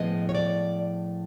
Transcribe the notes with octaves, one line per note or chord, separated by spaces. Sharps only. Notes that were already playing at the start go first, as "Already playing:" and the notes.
Already playing: A2 F3 G#3 B3 D#5
C#5
D5